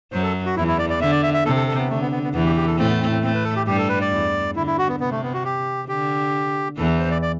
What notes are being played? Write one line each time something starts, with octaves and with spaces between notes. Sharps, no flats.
F#2 F#3 C5
A4
F#4
E2 E3 E4
E4
D5
D5
D3 E5
D5
E5
E5
C3 A4
A4
A4
B3
D3 A3
B3
B3
B3
E2 E3 B3
G4
G4
A4
A2 A3 C4
B3
C4
C4
A2 A3 C4
B4
A4
G4
G2 G3 G4
A4
B4
D5
E2 E3
D3 E4
E4
F#4
B3
C3 B3
A3
B3
F#4
G4
D3 G4
E2 E3 A4
C5
D5
D5